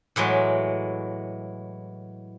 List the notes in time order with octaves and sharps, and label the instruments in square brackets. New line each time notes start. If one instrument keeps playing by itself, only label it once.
[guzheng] A2 E3 F#3 G#3